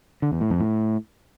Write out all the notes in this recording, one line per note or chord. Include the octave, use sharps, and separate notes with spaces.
D3
E2
A2
F2
A2